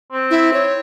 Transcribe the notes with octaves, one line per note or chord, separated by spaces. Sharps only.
C4
E4
C#5